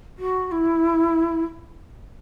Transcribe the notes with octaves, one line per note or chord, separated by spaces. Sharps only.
F#4
E4